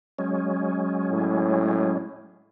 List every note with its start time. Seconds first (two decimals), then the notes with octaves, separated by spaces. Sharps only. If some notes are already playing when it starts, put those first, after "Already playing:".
0.19 F#3 G#3 C#4
1.11 A2